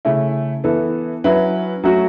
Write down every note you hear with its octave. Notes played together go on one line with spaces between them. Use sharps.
C#3 A3 E4
E3 B3 A4
F#3 C#4 E4 B4
F#3 A3 C#4 F#4